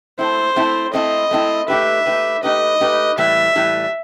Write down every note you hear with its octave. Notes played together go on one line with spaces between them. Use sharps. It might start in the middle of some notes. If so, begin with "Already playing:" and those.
A3 C4 E4 C5
A3 C4 E4
A3 C4 E4 D#5
A3 C4 E4
A3 D#4 G4 B4 E5
A3 D#4 G4 B4
A3 D#4 G4 B4 D#5
A3 D#4 G4 B4
A2 E3 G3 E5
A2 E3 G3